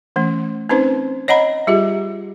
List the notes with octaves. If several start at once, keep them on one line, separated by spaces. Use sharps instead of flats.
E3 A3 C#4
C4 C#4 D#4 B4 C5
C#5 D#5 F#5 A#5 B5
G3 F4 G4 G#4